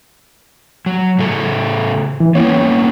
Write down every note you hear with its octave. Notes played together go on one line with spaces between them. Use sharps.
F#3
A2 C#3 A4
E3
A#3 B3 C#4 C#5